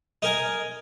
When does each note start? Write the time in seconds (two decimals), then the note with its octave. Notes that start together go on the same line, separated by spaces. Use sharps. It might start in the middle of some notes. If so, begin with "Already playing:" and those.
0.22 D#4 A#4 G#5